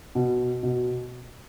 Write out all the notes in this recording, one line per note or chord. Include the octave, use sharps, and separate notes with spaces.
B2
B2